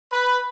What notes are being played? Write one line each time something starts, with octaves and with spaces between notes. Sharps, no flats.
B4